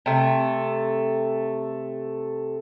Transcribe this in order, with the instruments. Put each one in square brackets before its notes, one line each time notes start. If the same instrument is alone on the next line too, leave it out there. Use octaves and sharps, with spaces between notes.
[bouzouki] C3 A3